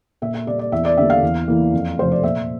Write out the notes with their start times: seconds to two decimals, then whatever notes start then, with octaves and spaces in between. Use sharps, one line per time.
0.22 A#2 E5
0.34 E5
0.47 G3 A#3 D5
0.59 D5
0.72 E2 E5
0.85 D5
0.97 D3 G3 A#3 E5
1.10 F5
1.22 E2
1.48 E3 A#3
1.73 F2
1.98 C3 F3 A3 C5
2.12 D5
2.23 A#2 E5